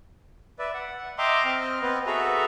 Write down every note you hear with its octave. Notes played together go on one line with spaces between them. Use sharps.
B4 D5 E5
F#5
D#5 E5 G5 A#5 C6 D6
C4 D#5 F6
B3 C4 B4
F#4 G#4 A4 B4 E5 A#5